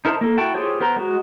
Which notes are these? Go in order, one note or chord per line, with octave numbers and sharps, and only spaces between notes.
D#4 E4 A#4 C5 A5
A#3 A4
E4 F#4 G5 A5
F4 G4 G#4 C5 C#5
B3 A#4 C5 A#5
G#3 F#4